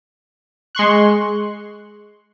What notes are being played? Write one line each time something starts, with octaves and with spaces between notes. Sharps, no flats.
G#3 C6 C#6 F#6